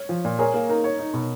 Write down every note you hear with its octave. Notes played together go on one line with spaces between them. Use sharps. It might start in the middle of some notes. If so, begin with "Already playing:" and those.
Already playing: C#5
F3
A#2
G#4 A#4 C#5
A#3
D#4 A#4
C#5
D#4
B2